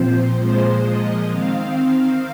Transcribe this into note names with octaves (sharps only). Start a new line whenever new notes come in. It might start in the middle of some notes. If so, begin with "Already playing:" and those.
Already playing: A#2 F3 C4 C5
A#2 F3 G#3 C5
D#5
D#3 C4 F5